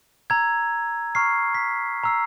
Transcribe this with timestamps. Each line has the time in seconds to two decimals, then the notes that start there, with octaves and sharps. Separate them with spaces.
0.30 A#5 E6 G#6
1.15 A#5 C#6 F6 C7
1.55 B6
2.04 A#5 E6 C7